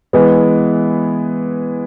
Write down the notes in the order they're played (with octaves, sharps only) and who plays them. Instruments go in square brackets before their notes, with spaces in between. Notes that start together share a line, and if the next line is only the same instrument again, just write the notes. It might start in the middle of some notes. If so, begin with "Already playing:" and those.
[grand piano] E3 G#3 B3